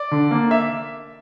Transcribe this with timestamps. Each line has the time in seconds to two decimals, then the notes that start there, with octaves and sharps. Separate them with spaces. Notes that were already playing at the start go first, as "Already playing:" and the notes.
Already playing: D5
0.11 D3
0.31 A#3
0.51 E5